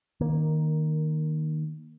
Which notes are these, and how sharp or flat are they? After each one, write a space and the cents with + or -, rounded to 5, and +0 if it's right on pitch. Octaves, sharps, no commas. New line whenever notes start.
D#3 -5 A#3 +10